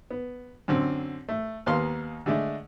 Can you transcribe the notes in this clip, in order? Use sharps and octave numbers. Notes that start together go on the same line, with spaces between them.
B3
F#2 D3 C4
A3
D#2 D#3 A#3 B3 F5 C6
D3 G#3 A3 D4